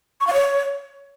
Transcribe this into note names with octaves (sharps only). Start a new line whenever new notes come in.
C#6
F5
C#5